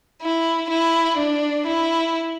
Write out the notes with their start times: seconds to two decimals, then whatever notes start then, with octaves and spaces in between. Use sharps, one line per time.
0.22 E4
0.70 E4
1.18 D4
1.66 E4